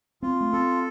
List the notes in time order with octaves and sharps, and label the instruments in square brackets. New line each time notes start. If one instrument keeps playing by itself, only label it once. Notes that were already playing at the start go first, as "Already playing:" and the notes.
[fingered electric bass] C4 [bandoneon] F4
[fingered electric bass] A3
[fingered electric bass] C4 [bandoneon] A4